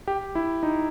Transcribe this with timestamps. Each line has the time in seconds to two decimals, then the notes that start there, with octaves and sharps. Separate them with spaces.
0.08 G4
0.35 E4
0.63 D#4